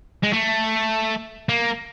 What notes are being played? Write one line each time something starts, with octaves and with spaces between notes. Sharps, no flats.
G#3
A3
A#3